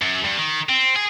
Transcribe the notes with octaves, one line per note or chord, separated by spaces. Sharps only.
F#2
G2
D#3
C4
G#4